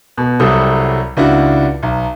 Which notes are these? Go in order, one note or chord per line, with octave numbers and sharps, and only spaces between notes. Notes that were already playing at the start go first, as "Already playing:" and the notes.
B2
C2 F#3 G3 A4 D#6
C#2 D4 E4 F#4
B1